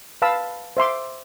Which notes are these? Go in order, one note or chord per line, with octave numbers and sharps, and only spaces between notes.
B4 F5 A5 B5 E6
C5 E5 C6 D6